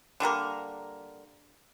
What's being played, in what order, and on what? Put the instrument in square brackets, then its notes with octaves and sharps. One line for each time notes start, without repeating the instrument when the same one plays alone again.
[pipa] D3 G3 A#3 A#4